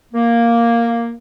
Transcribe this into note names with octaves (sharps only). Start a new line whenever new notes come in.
A#3